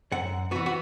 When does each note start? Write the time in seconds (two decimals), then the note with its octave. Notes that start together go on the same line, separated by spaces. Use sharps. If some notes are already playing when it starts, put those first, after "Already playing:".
0.12 F#2 F#5
0.51 E3 B3 F#4
0.66 F#4